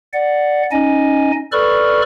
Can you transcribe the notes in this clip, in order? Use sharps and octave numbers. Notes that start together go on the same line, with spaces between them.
D5 F#5
C#4 D#4 D#5 G#5
A4 B4 D5 B5 C#6 F6